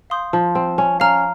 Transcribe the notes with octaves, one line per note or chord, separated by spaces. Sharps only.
F5 C6 D#6 G6
F3
C4
C#4
C#4 F5 A#5 F6